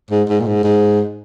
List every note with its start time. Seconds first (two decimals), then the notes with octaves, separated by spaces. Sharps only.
0.11 G#2
0.29 G#2
0.40 A#2
0.46 G#2
0.64 G#2